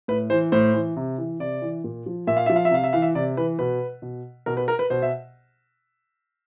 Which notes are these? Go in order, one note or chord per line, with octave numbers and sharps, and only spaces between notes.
A2 B4
E3 C5
A2 C5
E3
C3
E3
C3 D5
E3
A#2
F3
A#2 E5
F5
F3 E5
F5
E5
C3 F5
E5
E3 F5
E5
C3 D5
E3 B4
B2 B4
B2
B2 A#4
B4
A#4
B4
B2 C5
E5